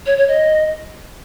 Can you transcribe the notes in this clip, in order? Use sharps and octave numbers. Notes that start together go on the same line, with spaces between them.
C#5
C#5
D#5